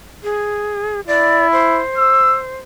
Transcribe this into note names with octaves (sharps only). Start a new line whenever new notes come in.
G#4
E4 D5
C5
E6